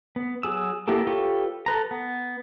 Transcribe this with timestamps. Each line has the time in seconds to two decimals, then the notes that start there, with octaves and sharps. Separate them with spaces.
0.16 B3
0.43 F#3 G#4 E6
0.88 A#3 B3 E4 G4 A4
1.07 F4 G4 A4 B4 C#5
1.66 A4 B4 A#5
1.91 B3